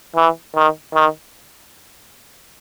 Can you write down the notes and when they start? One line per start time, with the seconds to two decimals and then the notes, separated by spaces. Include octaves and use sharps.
0.16 E3
0.55 D#3
0.94 D#3